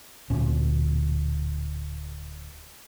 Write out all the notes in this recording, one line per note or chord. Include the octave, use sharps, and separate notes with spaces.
D1 D2 A#2 C#4